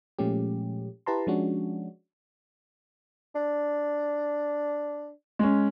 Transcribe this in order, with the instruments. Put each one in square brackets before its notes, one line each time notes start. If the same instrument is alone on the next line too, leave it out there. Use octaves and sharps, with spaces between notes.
[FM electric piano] A#2 F3 G#3 A3 C#4 G4
E4 G4 B4 A5 A#5 C6
F3 G#3 C#4 D4 F#4
[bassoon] D4
[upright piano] G#3 C#4